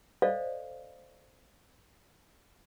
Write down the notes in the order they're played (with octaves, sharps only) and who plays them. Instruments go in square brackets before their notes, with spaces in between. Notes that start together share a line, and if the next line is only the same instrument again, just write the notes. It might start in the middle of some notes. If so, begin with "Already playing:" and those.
[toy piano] A4 C5 D5 D#5 F5